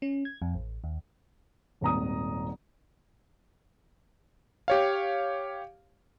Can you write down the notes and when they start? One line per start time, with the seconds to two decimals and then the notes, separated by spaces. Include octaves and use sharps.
0.02 C#4
0.25 G#6
0.42 F2
0.55 A1
0.84 D#2
1.81 D#1 G#1 A#5 D#6
4.68 G4 C#5 F5